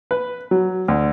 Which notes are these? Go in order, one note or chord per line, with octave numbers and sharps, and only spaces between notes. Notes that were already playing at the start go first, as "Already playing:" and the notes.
B4
F#3
D2